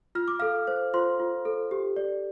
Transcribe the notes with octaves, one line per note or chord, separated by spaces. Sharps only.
F4 F6
D6
A4 F5 F6
C5
F4 C5 C6
F4
A4
G4
D5